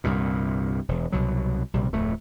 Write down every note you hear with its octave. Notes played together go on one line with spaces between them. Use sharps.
C2 G2 A#2
E1
C2 B2 F#3
A#1 C3 G3
D1 F2 A3